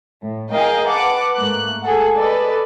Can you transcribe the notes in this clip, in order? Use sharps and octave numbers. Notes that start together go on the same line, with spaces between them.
A2
G#4 A#4 D#5 F5 G5
B4 F#5 A5 D6
G#2 A3 A#3 F#6
G#4 A4 F#5
A4 B4 D5 D#5